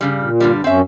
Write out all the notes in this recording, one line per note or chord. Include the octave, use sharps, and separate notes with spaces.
G2 C#3 G3
A#2
G2 D3 G3
F#2 C4 C#4 E5